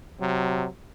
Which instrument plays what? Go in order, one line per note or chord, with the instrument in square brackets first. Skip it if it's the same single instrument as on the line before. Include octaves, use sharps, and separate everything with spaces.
[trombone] C3 [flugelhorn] F#3